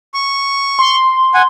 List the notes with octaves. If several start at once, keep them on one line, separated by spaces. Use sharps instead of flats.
C#6
C6
F#5 G#5